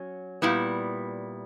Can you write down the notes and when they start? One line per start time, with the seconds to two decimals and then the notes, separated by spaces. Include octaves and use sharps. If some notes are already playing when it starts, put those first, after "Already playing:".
Already playing: F#3 C#4
0.42 A#2 G3 B3 E4